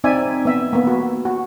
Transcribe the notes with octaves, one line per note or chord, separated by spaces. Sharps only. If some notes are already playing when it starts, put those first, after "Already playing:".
C4 D#4 D5 E5 G#5
B3 E5
A#3 B3
F#4
F#4